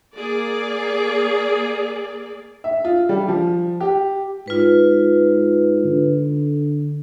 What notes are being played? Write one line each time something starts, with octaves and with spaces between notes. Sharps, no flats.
A#3 G#4 D5
E5
F4
G3
F3
G4
G#2 F4 B4
D3